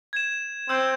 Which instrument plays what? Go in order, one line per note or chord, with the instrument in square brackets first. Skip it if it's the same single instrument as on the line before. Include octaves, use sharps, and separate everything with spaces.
[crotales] G#6 E7
[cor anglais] C4 [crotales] E6 G6 E7